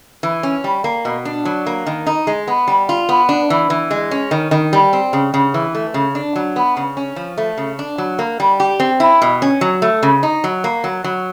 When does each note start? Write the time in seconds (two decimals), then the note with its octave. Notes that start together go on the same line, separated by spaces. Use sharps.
0.23 E3
0.43 C#4
0.64 G3
0.84 A#3
1.05 B2
1.25 D4
1.45 F#3
1.66 A#3
1.86 D#3
2.07 D#4
2.27 G#3
2.47 B3
2.68 G3
2.89 F4
3.09 B3
3.29 D4
3.50 E3
3.70 E3
3.91 G#3
4.11 C#4
4.31 D#3
4.51 D#3
4.73 G3
4.93 C4
5.13 C#3
5.34 C#3
5.54 E3
5.75 A3
5.94 C#3
6.15 D4
6.36 F#3
6.56 B3
6.77 C#3
6.97 C#4
7.16 F3
7.38 A3
7.58 C#3
7.79 D4
7.98 F#3
8.19 A#3
8.40 G3
8.60 G4
8.80 C4
9.00 E4
9.22 B2
9.42 C#4
9.61 F#3
9.82 A3
10.03 C#3
10.23 D#4
10.44 F#3
10.64 A#3
10.84 F#3
11.04 F#3